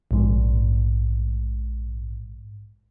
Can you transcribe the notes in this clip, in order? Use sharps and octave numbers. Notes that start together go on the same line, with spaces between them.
A#1 G#2